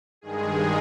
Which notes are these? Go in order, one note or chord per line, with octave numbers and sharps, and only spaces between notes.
G2 D#3 G#3 G#4